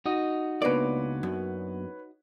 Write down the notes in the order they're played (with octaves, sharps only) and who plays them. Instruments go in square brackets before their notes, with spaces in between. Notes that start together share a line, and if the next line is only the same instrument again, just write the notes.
[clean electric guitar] D#4 F#4 D#5
[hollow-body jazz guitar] C#2 D5 [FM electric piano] A#3 B3 D4 [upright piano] B4 C#5
[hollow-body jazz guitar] F#2